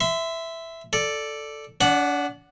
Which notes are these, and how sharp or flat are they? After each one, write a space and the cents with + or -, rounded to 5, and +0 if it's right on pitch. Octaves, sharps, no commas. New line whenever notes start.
E5 +0 C6 -35
A4 +0 D5 +0
D4 -40 D5 +15 F#5 +0